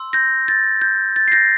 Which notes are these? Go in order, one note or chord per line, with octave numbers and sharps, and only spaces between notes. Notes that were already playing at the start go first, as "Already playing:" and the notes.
Already playing: C6 E6
G6 A#6
A6
G6
A6
C7
G6 A#6